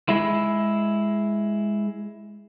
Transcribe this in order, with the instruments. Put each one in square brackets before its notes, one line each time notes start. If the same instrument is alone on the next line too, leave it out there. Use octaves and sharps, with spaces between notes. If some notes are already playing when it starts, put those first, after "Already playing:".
[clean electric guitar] G#3 E4